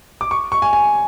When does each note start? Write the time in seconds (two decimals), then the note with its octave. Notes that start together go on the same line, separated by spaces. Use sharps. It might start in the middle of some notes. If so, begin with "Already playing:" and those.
0.21 D6
0.31 C#6
0.52 C#6
0.62 G#5
0.73 G#5